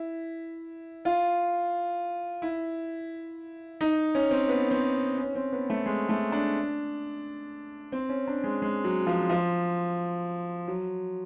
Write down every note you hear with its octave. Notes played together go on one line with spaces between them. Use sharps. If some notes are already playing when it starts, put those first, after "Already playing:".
Already playing: E4
F4
E4
D#4
C#4
C4
B3
C4
C#4
C4
B3
A3
G#3
A3
D4
C4
C#4
D4
G#3
G#3
F#3
F3
F3
F#3